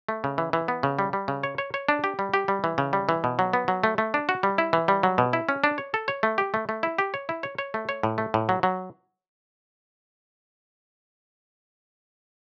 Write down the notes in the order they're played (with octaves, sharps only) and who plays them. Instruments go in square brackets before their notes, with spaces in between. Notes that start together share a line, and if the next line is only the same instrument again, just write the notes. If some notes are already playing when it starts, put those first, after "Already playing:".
[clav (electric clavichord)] A3
C#3
E3
E3
B3
C#3
G3
G3
C#3
C#5
C#5
C#5
D4
G4
G3
G4
G3
E3
C#3
G3
E3
B2
F#3
B3
F#3
A3
A3
D4
F#4
G3
E4
E3
G3
F#3
B2
E4
C#4
D4
C#5
A4
C#5
A3
G4
A3
A3
E4
G4
C#5
E4
C#5
C#5
A3
C#5
A2
A3
A2
F#3
F#3